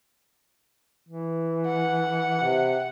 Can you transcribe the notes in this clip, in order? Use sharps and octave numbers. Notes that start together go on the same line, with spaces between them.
E3
F#5
C3